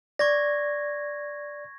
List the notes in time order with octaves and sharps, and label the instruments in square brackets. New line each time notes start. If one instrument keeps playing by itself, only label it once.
[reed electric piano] D5 [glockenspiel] C#6 G#6 A#6